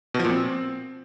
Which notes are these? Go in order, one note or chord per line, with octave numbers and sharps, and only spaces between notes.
B2
F3
A#2
C4